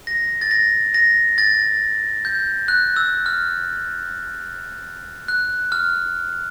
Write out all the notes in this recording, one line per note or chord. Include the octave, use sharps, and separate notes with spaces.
A#6
A6
A#6
A#6
A6
G6
F#6
E6
F6
F#6
F6